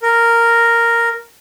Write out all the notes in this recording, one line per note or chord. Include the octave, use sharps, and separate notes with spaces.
A#4